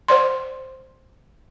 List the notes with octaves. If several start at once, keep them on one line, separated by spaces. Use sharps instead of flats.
C5 D5 C6